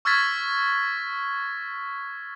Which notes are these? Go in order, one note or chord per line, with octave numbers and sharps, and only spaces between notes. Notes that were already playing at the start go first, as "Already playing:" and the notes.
C#6 E6 F6 G#6 A6 B6